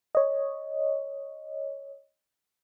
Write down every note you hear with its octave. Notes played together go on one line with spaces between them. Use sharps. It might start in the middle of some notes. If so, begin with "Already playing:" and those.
C#5 D#5